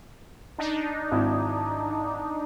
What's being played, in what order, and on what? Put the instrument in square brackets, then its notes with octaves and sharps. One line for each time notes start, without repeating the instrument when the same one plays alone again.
[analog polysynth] D4 D#4
[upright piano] G#1 E4